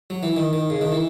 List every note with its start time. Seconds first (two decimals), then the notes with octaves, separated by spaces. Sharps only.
0.10 F#3
0.23 E3
0.37 D#3
0.53 D#3
0.70 C#3
0.81 D#3
0.92 E3